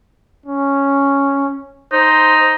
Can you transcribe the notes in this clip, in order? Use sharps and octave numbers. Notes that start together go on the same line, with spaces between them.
C#4
D#4 C5